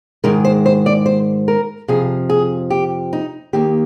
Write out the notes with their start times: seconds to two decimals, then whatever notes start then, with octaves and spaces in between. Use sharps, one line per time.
0.24 G#2 D#3 G#3 A#4
0.45 C5
0.66 C5
0.86 D5
1.06 C5
1.48 A#4
1.88 F2 C3 F3 G#4
2.30 G#4
2.70 G4
3.13 D#4
3.53 D#2 D#3 A#3 G4